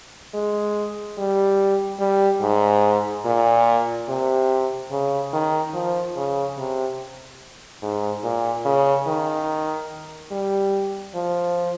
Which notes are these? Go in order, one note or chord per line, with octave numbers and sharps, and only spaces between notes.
G#3
G3
G3
G#2
A#2
C3
C#3
D#3
F3
C#3
C3
G#2
A#2
C#3
D#3
G3
F3